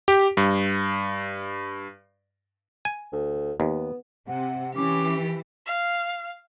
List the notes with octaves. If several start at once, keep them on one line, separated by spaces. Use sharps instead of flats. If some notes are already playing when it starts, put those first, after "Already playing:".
G4
G2
G#5
D2
D#2 B3
C3 F#5
E3 C#4 G4 D6
F5